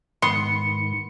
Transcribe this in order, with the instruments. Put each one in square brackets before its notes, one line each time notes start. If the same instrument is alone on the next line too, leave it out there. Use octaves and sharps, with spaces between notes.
[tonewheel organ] G#2 D#3 [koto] B3 [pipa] C6 [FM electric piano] C#7